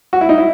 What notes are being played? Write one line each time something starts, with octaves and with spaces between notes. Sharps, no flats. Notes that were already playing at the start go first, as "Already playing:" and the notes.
F#4
E4
D#4
E4